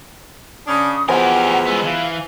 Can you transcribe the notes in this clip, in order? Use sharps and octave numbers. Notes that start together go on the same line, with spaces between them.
C#3 C#4 D4 D#6
E2 B2 F3 G4 A#4 C5 F#5 G#5
G#3 B3 E6
E3 F5